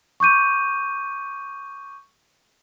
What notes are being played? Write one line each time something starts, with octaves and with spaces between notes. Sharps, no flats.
C#6 D6 G6 D#7